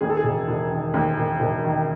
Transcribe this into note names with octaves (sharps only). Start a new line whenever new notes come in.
D#2 G#4
A4
G#4
E1
E1
D#3
D#2
E1
E1
D#3